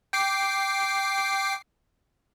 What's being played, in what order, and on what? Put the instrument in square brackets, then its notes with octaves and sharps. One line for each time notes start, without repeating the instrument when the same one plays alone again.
[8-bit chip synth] G5 D6 C7